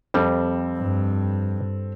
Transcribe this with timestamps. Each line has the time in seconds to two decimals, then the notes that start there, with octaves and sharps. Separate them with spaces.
0.14 F2 G3 C4 A4
0.77 G2